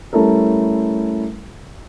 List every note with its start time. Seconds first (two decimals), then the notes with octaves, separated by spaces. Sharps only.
0.13 G3 A3 C#4 E4 A4 A#4